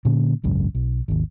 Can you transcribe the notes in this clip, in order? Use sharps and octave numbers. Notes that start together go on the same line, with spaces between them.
A#2 D3 A#3 C#4
G#1 C#2 F#2
B1
G#1 D#2